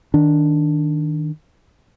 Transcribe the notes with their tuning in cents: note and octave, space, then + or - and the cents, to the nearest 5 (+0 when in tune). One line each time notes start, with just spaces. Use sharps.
D#3 +0 D4 +0